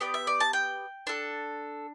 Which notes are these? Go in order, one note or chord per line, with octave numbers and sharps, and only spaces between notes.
B3 G4 D5
E5
D5
A5
G5
D4 A4